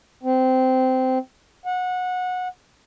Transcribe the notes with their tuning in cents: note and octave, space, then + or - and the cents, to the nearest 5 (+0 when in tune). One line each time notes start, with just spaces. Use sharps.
C4 -15
F#5 -20